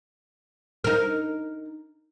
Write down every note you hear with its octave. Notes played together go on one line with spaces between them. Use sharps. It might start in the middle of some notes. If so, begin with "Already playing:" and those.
D#4 A#4